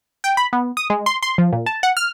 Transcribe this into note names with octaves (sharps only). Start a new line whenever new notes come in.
G5
B5
B3
D#6
G#3
C6
C6
F3
A#2
A5
F#5
F6